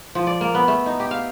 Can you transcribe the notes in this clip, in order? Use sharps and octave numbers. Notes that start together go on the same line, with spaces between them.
F3
D5
A#3
B3
A3
D#4
G4
F5